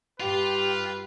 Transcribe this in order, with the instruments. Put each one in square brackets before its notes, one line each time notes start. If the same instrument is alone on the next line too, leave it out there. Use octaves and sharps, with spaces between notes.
[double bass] G2 [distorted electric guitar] F4 [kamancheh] G4 [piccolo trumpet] B4